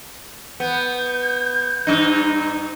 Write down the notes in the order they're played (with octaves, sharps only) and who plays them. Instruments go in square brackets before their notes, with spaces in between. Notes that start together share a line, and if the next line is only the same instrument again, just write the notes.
[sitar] B3 [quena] G6
[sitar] G2 D#4